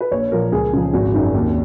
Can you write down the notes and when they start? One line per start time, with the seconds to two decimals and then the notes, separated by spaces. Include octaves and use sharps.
0.01 B4
0.12 A#1 C#5
0.32 A#2 F3 A#4
0.52 C#2 G#4
0.73 C#3 F3
0.93 G#1 F#4
1.14 F#2 D#3
1.34 D#2